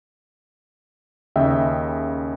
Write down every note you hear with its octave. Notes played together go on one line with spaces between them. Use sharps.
D#2 C#3 D#5 E5 G5